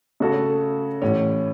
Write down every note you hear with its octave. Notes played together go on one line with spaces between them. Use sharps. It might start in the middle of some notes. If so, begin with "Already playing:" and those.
C#3 A3 F#4 A4 C#5
A1 A2 E3 C#4